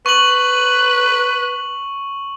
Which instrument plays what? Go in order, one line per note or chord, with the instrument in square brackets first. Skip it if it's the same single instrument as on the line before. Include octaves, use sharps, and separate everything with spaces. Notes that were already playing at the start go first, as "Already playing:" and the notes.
[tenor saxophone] B4 [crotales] C#6 F#7